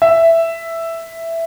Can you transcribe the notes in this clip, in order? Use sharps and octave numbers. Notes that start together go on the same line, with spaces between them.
E5